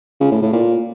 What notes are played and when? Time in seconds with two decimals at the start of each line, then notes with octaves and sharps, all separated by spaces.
0.21 C#3
0.31 A2
0.42 A2
0.53 A#2